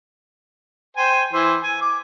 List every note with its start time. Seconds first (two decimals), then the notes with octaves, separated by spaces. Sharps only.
0.97 C5 G5 G#5
1.33 E3 C5
1.64 G#5
1.81 D6